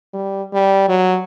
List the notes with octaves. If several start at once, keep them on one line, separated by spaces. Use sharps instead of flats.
G3
G3
F#3